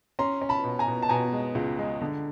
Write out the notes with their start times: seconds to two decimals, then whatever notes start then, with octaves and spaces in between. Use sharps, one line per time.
0.19 C#4 A#5 C6
0.42 C#4
0.49 A5 B5
0.64 B2
0.79 G#5 A#5
0.88 B2
1.03 A5
1.09 B2 G#5 A#5
1.33 G#3
1.55 C#2
1.79 G#3
2.02 D3